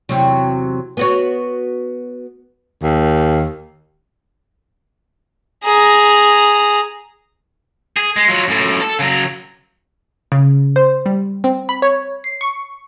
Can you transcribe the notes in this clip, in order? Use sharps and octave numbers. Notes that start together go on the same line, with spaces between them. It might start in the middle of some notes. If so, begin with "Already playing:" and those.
E2 C3 F#3
B3 F#4 C#5
D#2
G#4 A#5
G#4
G#3
F#3 F4
F#2 A2
A4 A5
C#3 F#3
C#3
C5
G3
C4
B5
C#5
C7
C#6